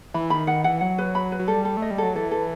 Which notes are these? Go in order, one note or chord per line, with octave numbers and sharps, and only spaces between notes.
E3 B5
D#3 B5
D#3 F#5
E3 F#5
F#3 F#5
B4
B5
B4
F#3
G3 A4
A4
A3
D#5
G3
F#3 A4
E3 A4
A4